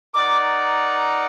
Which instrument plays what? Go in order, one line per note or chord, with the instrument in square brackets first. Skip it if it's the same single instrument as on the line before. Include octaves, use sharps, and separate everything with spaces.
[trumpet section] D#4 A#4 D5 F#5 [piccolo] D6